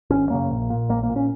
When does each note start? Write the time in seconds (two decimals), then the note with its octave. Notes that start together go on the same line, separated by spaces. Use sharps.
0.10 G#1 C#4
0.29 F#2 C#3 A#3
0.50 A#1
0.70 A#2
0.89 A#1 A#3
1.03 A#3
1.09 A#2
1.16 C#4